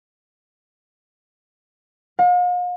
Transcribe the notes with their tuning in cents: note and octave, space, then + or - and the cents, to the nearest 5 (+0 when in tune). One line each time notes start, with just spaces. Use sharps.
F5 +45